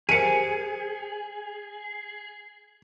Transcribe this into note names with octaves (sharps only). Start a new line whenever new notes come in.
G4 G#4 A#4 C5 C#7 D#7